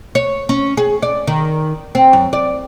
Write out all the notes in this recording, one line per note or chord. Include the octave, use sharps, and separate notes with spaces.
C#5
C#4
G#4
D5
D#3
C4
F#2
D5